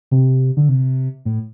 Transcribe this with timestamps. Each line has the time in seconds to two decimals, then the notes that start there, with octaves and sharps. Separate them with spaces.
0.11 C3
0.57 D3
0.69 C3
1.25 A2